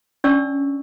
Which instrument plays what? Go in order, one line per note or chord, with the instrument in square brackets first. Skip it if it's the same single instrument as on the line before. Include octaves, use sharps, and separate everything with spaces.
[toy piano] C#4 D4 C#5 D5 C#6 E6